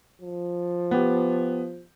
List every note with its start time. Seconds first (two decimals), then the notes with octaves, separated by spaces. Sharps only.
0.21 F3
0.91 B3 G4